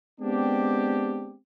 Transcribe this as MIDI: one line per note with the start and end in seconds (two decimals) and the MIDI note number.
0.21 1.35 56
0.21 1.35 59
0.21 1.35 60
0.21 1.35 62
0.21 1.35 67